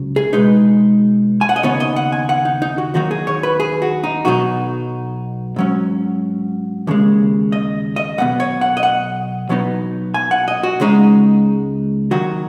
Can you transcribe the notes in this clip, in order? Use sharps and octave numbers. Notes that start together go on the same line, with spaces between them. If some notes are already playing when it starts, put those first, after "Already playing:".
Already playing: C#2 C#3 F#3
G#4
B2 G#3 D#4 B4
G#5
F#5
D#5
D#2 C#3 B3 D#4 C#5
D#5
F#5
G#5
F#5
D#4
D#4
F#4
D#2 D#3 F#3 D#4 F#4
G#4
C#5
B4
G#4
F#4
D#4
B1 B2 F#3 D#4 F#4
G#2 F#3 C#4
D#2 C#3 G#3
D#5
D#5
B1 B2 B3 F#5
C#5
F#5
D#5
F#5
B2 F#3 B3 D#4
G#5
F#5
D#5
F#4
C#2 C#3 G#3 D#4
D#2 D#3 F#3 F#4